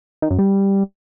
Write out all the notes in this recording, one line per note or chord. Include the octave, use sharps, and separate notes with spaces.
D#3
F#2
G3